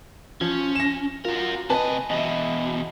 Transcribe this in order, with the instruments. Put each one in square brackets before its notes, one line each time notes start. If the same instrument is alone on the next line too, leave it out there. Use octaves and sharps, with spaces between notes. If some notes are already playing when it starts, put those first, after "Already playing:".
[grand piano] F3 [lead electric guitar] C#4
[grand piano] A#6 E7
[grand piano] F4 [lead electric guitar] F#4 A#4
[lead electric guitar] C3 D#5 [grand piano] B4 G#5 A5
[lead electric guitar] E2 B2 [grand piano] D#5 E5